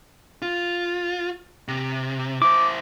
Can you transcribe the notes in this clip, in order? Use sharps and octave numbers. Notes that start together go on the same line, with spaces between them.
F4
C3
E4 C5 D6